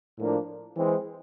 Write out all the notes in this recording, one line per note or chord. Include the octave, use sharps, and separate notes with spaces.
A2 F3 A#3 D4
E3 G#3 C4